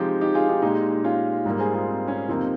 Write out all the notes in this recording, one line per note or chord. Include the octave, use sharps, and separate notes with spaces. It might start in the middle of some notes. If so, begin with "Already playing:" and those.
Already playing: C3 F3 G#3 D#4 G4
D#4 G4
F4 G#4
D#4 G4
A#2 G#3 D#4 G4
C#4 F4
G#2 G3 A#3
G#4 C5
F4 G#4
C4
C#4
F2 C3 F3 A#3 C4 D#4